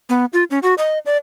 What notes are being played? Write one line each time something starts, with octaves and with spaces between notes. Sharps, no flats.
B3
F4
C#4
F#4
D#5
D5